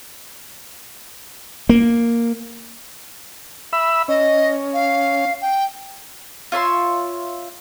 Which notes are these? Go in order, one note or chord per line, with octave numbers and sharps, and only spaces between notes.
A#3
E5 B5 E6
C#4 D#5
F5
G5
F4 C#5 E5 C6